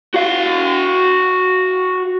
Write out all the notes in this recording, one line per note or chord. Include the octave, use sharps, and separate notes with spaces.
F#4 F5